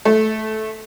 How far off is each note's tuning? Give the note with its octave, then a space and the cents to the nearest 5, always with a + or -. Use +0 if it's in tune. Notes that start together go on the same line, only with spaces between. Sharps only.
A3 -15